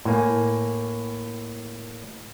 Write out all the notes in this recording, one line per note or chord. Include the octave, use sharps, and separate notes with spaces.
A2 A#3 G#5